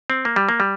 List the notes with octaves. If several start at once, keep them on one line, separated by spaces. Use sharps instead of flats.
C4
A#3
G3
A#3
G3